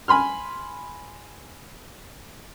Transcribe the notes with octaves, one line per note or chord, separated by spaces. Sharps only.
G#5 B5 C6 F6